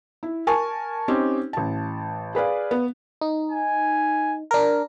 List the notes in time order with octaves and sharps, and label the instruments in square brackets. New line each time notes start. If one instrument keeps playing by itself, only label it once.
[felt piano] E4
A#4 G#5 A5 C#6
C4 C#4 D#4 G4
A1 A5
G#4 B4 D5 F5
B3
[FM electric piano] D#4
[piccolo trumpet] G#5
[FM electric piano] D4 A#4